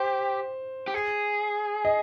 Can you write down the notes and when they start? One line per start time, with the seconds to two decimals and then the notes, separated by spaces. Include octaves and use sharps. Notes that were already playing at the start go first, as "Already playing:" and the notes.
Already playing: G4 C5
0.88 G4
0.94 G#4
1.85 D#5